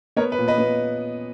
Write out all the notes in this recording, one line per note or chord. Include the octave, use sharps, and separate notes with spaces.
B3 A#4 C#5
B4
A#2
B4 D#5
B3